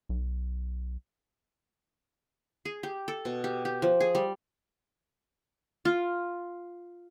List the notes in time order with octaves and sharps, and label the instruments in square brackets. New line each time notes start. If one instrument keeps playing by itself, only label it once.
[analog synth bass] B1
[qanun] G#4
G4
A4
B2
G4
G4
F3
G#4
G3
F4